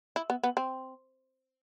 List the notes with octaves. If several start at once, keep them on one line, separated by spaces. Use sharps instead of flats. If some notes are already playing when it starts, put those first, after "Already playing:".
E4
B3
B3
C4